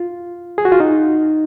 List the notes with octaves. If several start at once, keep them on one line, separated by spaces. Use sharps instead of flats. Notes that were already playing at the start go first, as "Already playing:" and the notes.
Already playing: F4
G#4
F#4
F4
D#4